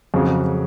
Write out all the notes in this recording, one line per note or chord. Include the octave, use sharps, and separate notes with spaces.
F2 C#3 F#3